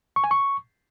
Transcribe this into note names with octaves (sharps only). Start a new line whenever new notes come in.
C#6
G#5
C#6